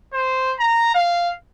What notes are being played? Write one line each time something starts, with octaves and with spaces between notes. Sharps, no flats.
C5
A#5
F5